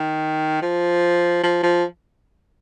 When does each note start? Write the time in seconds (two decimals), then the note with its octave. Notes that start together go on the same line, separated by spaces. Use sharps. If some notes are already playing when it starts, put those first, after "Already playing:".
Already playing: D#3
0.62 F3
1.43 F3
1.63 F3